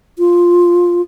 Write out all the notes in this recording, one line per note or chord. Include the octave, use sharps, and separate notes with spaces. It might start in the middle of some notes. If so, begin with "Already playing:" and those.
F4